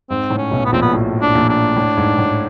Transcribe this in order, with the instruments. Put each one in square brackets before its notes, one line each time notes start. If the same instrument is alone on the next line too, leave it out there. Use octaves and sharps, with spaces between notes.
[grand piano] G#2 [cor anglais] C4
[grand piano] A2
[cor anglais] C#4
[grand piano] B1 B2
[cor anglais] B3
[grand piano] A#1 A#2 [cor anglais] C4
[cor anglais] B3
[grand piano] A2
[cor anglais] D4
[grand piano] A#1 A#2
[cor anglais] D4
[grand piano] A2
G#2
A2